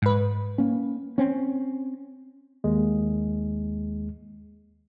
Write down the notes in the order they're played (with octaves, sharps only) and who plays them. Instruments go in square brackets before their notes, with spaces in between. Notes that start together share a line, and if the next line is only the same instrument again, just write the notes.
[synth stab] G#2 B4
[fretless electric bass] A#3 C#4
C4 C#4
[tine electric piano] D#2 G#3